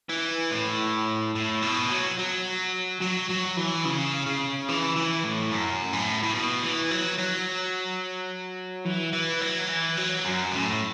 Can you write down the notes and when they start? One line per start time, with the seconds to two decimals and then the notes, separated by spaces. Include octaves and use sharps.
0.09 E3
0.52 A2
1.35 A2
1.62 B2
1.90 F#3
2.19 F#3
3.01 F#3
3.29 F#3
3.57 E3
3.85 C#3
4.26 C#3
4.68 E3
4.96 E3
5.24 A2
5.51 F#2
5.93 A2
6.23 A2
6.35 B2
6.63 E3
6.91 F#3
7.19 F#3
8.85 E3
9.13 E3
9.41 F#3
9.68 E3
9.97 F#3
10.25 F#2
10.52 A2